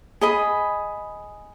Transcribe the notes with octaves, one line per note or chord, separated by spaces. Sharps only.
G#4 D#5 B5